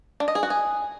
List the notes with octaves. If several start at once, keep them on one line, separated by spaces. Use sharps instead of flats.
D4
D#5
G#4
F#4
G#4